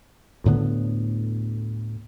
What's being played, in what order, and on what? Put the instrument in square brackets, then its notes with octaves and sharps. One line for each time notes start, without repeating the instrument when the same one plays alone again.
[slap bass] D2 A2 D3 B3